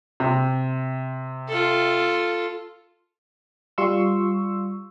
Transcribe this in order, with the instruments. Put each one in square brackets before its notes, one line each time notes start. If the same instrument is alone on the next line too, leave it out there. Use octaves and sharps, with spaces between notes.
[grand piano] C3
[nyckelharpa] F4 A4
[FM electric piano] G3 F4 C6 C#6 E6